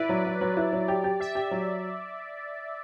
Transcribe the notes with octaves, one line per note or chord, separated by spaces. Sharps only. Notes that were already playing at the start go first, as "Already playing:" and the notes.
Already playing: E4 B4 D5
F#3
F#3
F#3
E4
F#3
G4
G4
G4 E5
G4
F#3